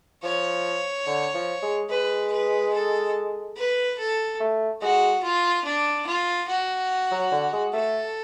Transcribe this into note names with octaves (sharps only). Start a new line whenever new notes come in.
F3 C#5
D3
F3
G#3
G#3 B4
B4
A4
B4
A4
A3
G#3 F#4
F4
D4
F4
F#4
F#3
D3
G#3
A3 A4